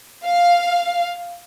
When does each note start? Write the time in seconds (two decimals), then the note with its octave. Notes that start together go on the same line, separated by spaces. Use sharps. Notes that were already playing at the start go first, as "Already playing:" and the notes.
0.23 F5